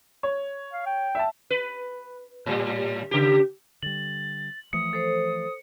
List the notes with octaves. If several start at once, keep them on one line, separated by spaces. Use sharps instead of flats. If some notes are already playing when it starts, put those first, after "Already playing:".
C#5
F5
G5
E5 A5
B4
A2 G3
C#3 G4
D3 G3 A6 F#7
E3 F3 A3 D#6 C#7
A4 C5